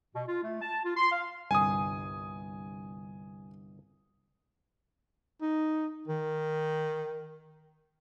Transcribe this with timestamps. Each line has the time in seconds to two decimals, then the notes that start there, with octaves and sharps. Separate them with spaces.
0.15 B2
0.28 F4
0.43 A3
0.62 A5
0.84 F4
0.96 C6
1.12 F5
1.51 G1 C2 G2 G#5 D#6
5.42 D#4
6.08 D#3